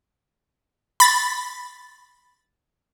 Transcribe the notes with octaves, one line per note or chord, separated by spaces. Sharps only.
B5 A6